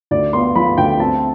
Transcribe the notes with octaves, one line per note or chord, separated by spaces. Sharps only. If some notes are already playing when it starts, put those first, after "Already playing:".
D2 D5
B3 C6
F3 B5
D2 G5
C4 A5